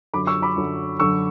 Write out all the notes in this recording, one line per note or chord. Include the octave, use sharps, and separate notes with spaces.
F#2 D3 F#3 B5 D6
C#6 E6
B5 D6
F#2 D3 F#3
F#2 D3 F#3 C#6 E6